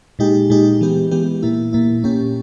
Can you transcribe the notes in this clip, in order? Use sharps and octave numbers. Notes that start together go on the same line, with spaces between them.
A#2 G#3 D#4 G4
A#2 G#3 D#4 G4
E3 G#3 B3 G4
E3 G#3 B3 G4
A#2 A#3 E4
A#2 A#3 E4
A#2 A#3 C#4 G4